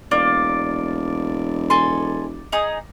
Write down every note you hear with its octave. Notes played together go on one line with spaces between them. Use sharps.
E1 A#3 D5
A4 G#5 C6
D#4 G#4 D#6